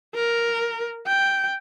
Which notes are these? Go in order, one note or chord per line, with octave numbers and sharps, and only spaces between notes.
A#4
G5